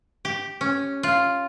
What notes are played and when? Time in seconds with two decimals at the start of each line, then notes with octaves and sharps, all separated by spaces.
0.25 G4
0.61 C#4
1.03 F4